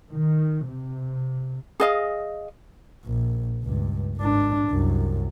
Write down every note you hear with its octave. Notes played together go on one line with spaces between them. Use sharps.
D#3
C3
G#4 D#5 F5
A#1
C#2 G2
G#1 D4
C2 F#2